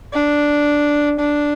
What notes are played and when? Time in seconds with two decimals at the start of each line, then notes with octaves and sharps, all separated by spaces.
0.13 D4
1.19 D4